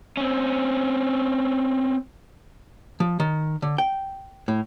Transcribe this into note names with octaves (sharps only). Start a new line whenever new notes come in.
C4 C#4
F3
D#3
D3
G5
A2